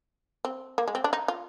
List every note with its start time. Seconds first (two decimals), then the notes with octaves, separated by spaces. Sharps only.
0.45 C4
0.78 A#3
0.88 G#3
0.95 C4
1.04 D4
1.13 D#4
1.28 F4